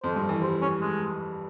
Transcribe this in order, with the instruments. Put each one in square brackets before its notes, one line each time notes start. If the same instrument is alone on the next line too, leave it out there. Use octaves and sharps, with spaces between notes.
[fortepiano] F2 [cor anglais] C5
[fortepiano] G2
E3
[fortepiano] G3 [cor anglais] C5
[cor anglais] C#4
G#3